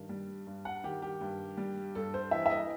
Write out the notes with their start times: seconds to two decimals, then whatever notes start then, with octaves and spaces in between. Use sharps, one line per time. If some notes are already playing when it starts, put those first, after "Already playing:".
Already playing: G2 D#3
0.09 G3
0.47 G2
0.65 F#5
0.84 D#3 G4
1.02 G4
1.21 G2
1.57 G3
1.95 G2 A4
2.14 C5
2.31 E3 E5
2.46 E5
2.50 D#5